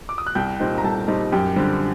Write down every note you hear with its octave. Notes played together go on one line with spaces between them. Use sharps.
D6
D#6
F#6
C2 G5 G6
A#2 G3 C4 D#4
A#5
C2 A4 A5
A#2 G3 C4 D#4
F#2 G4 G5
D3 G3 C4